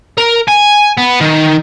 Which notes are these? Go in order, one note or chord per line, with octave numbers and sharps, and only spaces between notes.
A#4
G#5
B3
D#3